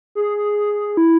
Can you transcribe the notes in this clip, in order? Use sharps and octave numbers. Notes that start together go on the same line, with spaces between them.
G#4
E4